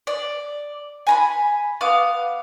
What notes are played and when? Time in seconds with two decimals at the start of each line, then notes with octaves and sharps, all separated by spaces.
0.07 D5
1.07 G#5 A#5 B5
1.81 B3 F5 D6